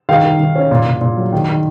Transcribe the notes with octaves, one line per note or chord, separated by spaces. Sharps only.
D#3 F5
D#3
D#3
C#4
A#2
A#2
A#2
F#3
D#3
D#3